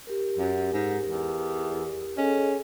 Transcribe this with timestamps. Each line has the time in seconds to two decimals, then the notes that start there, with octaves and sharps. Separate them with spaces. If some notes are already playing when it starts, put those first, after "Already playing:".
0.07 G4 A#4
0.38 F#2
0.73 G#2
1.06 E2
2.17 C#4 G#4 A4 D#5